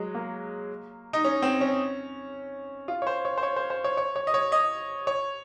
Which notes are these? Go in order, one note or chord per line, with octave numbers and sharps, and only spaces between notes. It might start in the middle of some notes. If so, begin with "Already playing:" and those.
Already playing: F#3 G#3
A#3
D#4
C#4
C4
C#4
F4
C#5
C5
C#5
C5
C#5
C5
C5
C#5
C#5
C#5
D#5
C#5
D#5
C#5